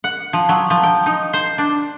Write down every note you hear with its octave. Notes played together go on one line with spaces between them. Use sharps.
F#5
F3
F#3
F3
G5
D#4
C5
D4